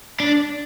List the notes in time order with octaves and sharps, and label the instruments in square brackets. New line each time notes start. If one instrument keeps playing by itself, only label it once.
[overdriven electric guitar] D4